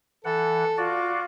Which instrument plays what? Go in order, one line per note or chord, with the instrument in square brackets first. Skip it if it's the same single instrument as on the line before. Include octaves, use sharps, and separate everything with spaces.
[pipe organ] E3 F#5 [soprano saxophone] A4
[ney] F4 [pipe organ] F#4 D5